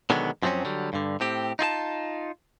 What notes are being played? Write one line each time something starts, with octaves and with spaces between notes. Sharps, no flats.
B2 D3 D#3 F#3 G#3 B3
F#2 F3 F#3 A3 C4 C#4
D3 F#3 G3
G2 D3
A2 C4 G4
D#4 F4 G#4 A5